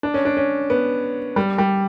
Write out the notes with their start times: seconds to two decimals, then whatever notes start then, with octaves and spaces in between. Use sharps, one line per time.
0.03 D4
0.14 C#4
0.25 D4
0.37 C#4
0.70 B3
1.36 G3
1.58 G3